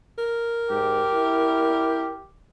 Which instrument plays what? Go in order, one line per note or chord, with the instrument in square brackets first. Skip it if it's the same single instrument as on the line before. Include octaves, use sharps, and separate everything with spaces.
[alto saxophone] A#4
[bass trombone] G#2 [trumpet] G4
[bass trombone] E4